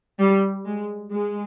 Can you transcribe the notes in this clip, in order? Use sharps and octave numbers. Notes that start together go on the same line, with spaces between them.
G3
G#3
G#3